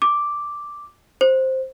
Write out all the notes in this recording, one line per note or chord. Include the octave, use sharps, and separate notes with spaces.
D6
C5